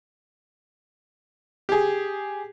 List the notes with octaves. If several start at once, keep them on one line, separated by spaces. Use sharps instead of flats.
G4 G#4